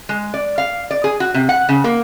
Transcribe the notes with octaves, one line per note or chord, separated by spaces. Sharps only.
G#3
D5
F5
D5
G#4
F#4
C3
F#5
C#3
A#3